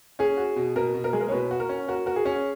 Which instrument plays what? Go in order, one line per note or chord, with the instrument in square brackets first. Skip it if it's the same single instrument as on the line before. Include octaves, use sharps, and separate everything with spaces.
[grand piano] C#4 [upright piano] G#4
[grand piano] F#4
B2
[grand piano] B2 [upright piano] A#4
[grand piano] B2
[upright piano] A#4
[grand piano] G#3 [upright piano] G#4
[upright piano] A#4
C#5
[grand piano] B2 [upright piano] B4
[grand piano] F#4
[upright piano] A#4
[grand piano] C#4
[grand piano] F#4 [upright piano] A#4
[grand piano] F#4 [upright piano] A#4
[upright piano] G#4
[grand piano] C#4